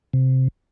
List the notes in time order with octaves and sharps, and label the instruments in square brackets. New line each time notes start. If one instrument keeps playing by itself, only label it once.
[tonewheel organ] C3